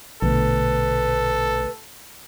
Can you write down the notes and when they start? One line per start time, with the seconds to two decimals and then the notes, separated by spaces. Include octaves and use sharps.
0.22 A#1 B2 D3 A3 A4 B4